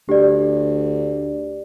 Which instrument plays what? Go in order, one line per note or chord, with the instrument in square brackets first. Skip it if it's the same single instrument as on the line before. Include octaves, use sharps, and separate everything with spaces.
[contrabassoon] D2 [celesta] G4 D5